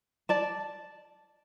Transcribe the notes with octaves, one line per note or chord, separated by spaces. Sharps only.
D5 A5